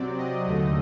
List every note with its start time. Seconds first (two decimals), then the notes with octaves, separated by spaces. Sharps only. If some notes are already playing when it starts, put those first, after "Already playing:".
Already playing: C3 F#3 C4 D5
0.18 D#5
0.47 D#2 D3 A3